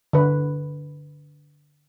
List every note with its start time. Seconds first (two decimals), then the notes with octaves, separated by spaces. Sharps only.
0.13 D3 B4